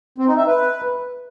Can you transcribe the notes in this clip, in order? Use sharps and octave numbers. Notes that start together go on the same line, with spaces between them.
C4
D#4
E5
B4